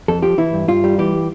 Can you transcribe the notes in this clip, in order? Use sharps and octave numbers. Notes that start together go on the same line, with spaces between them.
F2 A4
F3 G4
E3 E4
G2
G2 F4
G3
E3 G4